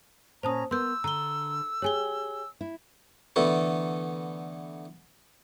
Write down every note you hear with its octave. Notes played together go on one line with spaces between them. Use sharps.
A#2 C#4 C5 A5 A#5 D#6
B3 A#4 C6 E6 G6
D3 A#5 G7
G4 G#4 C#5 G#5 G7
E4
D3 E3 A3 B3 E4 A4